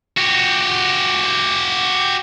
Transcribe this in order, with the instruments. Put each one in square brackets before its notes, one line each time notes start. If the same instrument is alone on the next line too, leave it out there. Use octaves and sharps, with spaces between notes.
[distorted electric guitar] F#4 G4